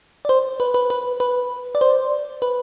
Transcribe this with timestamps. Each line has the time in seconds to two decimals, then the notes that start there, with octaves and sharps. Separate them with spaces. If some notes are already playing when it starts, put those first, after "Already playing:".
0.25 D5
0.29 C5
0.60 B4
0.74 B4
0.90 B4
1.20 B4
1.75 D5
1.81 C5
2.42 B4